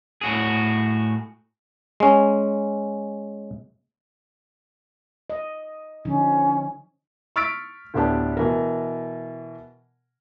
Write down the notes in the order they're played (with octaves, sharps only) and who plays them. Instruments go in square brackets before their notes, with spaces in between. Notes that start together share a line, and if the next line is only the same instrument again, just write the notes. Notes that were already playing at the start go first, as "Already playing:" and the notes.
[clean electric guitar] A2 F#4 G#4
[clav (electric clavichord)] G#3 C#4
[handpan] D#5
[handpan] D3 F3 D#4 [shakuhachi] C#4
[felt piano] C#6 E6 F6 A6 B6 D7
D2 A2 B3 D4 G4 A5
B2 E3 A#4